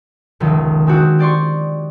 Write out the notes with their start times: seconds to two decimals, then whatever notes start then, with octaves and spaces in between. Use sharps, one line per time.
0.40 F1 C#2 D#3
0.87 G#3 C4 D4 F#4
1.19 G4 D5 C6 C#6